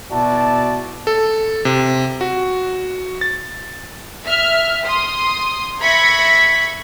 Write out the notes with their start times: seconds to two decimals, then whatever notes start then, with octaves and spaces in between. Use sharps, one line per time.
0.12 B2 E4 F#4 D5 A5
1.07 A4
1.65 C3
2.21 F#4
3.21 A6
4.25 E5 F6
4.86 C6 D#6
5.81 E5 B5 C#6 G#6 A#6 B6